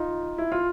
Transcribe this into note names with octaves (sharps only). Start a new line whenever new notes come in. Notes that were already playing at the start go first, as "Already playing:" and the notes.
Already playing: D#4 F4
E4
F4